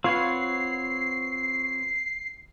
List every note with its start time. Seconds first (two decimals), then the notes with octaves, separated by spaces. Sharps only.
0.04 C4 F4 B4 C#5 F#5 C7